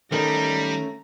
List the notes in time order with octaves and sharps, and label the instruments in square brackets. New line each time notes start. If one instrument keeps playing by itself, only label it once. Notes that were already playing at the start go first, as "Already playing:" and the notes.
[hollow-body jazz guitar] D#3 [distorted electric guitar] G3 [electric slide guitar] A3 C#4 A4 [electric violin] A#5